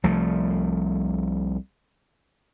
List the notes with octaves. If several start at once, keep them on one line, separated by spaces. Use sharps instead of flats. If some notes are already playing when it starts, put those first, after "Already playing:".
C2 F3 A3